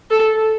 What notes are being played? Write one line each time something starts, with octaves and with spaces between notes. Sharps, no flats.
A4